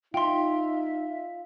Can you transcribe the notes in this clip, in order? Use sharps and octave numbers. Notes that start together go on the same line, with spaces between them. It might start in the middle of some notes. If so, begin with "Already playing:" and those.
D#4 F4 E5 G5 C6